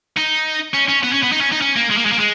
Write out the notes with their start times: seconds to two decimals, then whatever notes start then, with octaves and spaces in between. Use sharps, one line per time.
0.17 D#4
0.74 C#4
0.88 C#4
1.04 B3
1.13 C#4
1.23 B3
1.32 D#4
1.41 C#4
1.52 D#4
1.61 C#4
1.76 A#3
1.90 G#3
1.97 A#3
2.05 G#3
2.12 A#3
2.18 G#3